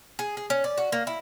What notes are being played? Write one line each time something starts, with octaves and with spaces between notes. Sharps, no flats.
G#4
G#4
C#4
D5
F#4
A#3
E4